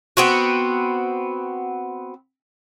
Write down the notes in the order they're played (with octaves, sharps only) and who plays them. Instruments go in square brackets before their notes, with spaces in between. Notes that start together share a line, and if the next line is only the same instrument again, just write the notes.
[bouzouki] B3 C4 F#4